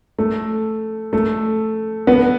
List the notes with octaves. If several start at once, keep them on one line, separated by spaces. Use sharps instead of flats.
A3
A3
B3